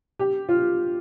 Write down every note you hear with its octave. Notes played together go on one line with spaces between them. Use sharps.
G4
F4